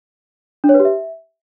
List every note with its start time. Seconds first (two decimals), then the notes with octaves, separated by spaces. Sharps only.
0.64 D4
0.69 C#5
0.74 B4
0.80 G4
0.85 E5